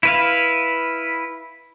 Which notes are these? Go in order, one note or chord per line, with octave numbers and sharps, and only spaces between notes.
E4 B4 F5